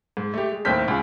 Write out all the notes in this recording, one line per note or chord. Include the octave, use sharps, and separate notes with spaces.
G#2
A3 G4
G#3
D#2 A2 C4 F6 G6 B6
C#2 G#4